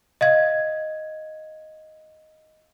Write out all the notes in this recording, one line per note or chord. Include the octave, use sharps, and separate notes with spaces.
D#5 F5 G#6